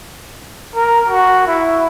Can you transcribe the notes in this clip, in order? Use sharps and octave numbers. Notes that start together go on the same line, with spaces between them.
A#4
F#4
E4